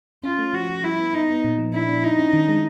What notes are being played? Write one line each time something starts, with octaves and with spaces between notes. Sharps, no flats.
C#4 F4
A3
F3 F#4
F3
G3 E4
B3
B3 D#4
B3
A#2
F3
D4 E4
D4
D#4 E4
C#4
D#3
G#3